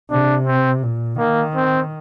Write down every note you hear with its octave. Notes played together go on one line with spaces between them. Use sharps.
C3 D4
C4
A#2
D#3 A#3
C4